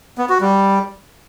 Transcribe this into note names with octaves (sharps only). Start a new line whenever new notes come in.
B3
F#4
G3